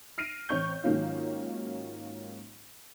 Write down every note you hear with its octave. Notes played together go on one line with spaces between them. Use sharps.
F6 A#6 C7 D7 D#7
A1 C4 C#5 C#6 G6
G#2 D#3 F#3 A#3 C#4 F4